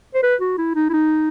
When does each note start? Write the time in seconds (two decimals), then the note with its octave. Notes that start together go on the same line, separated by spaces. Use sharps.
0.14 C5
0.23 B4
0.41 F#4
0.58 E4
0.75 D#4
0.90 E4
0.93 D#4